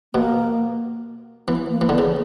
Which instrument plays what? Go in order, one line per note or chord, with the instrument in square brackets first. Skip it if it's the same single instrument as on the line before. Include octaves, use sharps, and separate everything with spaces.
[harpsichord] B2 [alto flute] A#3
[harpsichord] E3 [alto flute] B3
[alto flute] A#3
[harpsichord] E3
[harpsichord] D3 [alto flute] B3
[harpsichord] C#3